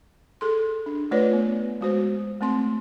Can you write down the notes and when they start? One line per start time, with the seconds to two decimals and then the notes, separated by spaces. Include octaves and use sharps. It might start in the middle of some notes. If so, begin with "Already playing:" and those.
0.41 G#4 A4 C6
0.86 D4
1.11 A3 F4 B4 C#5 D5
1.33 B3
1.81 G#3 F#4 C5
2.41 A3 C4 C6